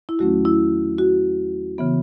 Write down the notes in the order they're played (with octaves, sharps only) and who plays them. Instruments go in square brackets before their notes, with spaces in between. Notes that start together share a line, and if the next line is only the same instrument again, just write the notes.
[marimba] E4
E2 D#3 F#3 A3 C#4 F#4
E4
F#4
C#3 E3 B3